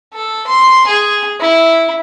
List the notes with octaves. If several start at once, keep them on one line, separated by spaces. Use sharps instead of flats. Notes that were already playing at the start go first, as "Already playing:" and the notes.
A4
C6
G#4
E4